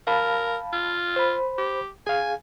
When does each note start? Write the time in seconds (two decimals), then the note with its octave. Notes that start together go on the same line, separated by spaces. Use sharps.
0.07 A#4 F5 A5 B5
0.73 F4
1.16 C5 B5
1.58 G4
2.07 G#4 F5 G#5